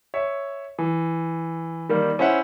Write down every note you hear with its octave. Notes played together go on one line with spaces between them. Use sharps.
C#5 E5
E3
D#3 G3 A#3
C#4 E4 C5 E5 F#5